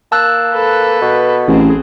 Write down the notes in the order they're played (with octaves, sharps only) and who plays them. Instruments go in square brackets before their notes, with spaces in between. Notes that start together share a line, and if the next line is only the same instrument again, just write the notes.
[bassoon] A#3 [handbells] A5 E6 F#6
[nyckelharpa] A4 B4
[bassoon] B2
[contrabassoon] A1 [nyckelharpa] C4 G#4